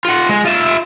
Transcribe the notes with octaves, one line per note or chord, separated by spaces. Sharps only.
F4 F#5
G#3
F4 E5